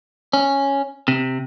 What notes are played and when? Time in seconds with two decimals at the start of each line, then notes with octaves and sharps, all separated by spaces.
0.33 C#4
1.08 C3